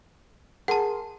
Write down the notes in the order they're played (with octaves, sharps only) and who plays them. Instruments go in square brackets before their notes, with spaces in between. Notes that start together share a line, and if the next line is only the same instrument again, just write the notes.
[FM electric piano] G#4 A#4 C6 [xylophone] F#5 A5